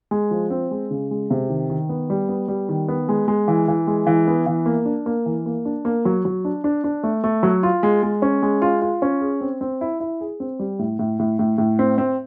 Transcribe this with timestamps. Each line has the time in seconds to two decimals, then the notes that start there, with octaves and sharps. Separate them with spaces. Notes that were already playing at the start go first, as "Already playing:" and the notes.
0.11 G#3
0.31 F3
0.50 C4
0.71 G#3
0.91 C#3
1.11 G#3
1.30 C3
1.49 D#3
1.70 D#3
1.89 B3
2.10 G3
2.29 B3
2.48 G3
2.69 D#3
2.88 B3
3.09 G#3
3.28 G#3
3.48 E3
3.68 E3
3.87 G#3
4.07 E3
4.27 B3
4.46 E3
4.66 A#3
4.85 D4
5.06 A#3
5.26 E3
5.46 A#3
5.65 D4
5.85 A#3
6.05 F#3
6.25 F#3
6.45 D4
6.64 D4
6.84 D4
7.03 A3
7.24 A3
7.43 F#3
7.63 F4
7.83 G#3
8.03 G#3
8.22 C#4
8.42 G#3
8.62 F4
8.82 F4
9.02 C#4
9.21 G#4
9.41 C4
9.61 C4
9.81 E4
10.00 E4
10.21 G#4
10.40 C4
10.59 G3
10.79 A2
10.99 A2
11.19 A2
11.39 A2
11.58 A2
11.79 C4
11.98 C4